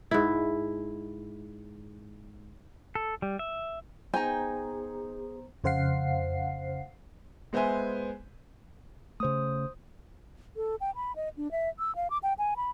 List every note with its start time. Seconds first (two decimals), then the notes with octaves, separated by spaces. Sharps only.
0.11 G#2 E4
2.95 A4
3.22 G3
3.39 E5
4.14 B3 D#4 G#4 C5 G5 G#5 A#5
5.64 F2 C#3 C5 F5 F#5 C7
7.53 G#3 B3 C5 E5 G#5
9.20 C#3 A3 C5 D#6
10.56 A4
10.81 G5
10.96 B5
11.16 D#5
11.37 D4
11.51 E5
11.79 E6
11.96 F5
12.10 D6
12.23 G5
12.39 G#5
12.57 B5